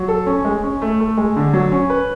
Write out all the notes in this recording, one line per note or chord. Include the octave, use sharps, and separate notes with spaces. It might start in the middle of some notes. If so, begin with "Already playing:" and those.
Already playing: F#3
A4
C#4
G#3
C#4
A3
A3
G#3
D3
F#3
C#4
B4